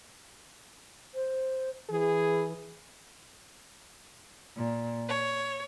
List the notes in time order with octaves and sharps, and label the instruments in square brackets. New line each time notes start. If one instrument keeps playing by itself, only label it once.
[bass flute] C5
[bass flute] E3 [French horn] G#4
[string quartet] A#2
C#5